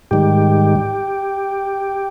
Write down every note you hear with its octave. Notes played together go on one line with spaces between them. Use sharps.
G#2 D#3 G3 G4